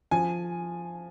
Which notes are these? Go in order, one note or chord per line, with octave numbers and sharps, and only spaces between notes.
F3 G#5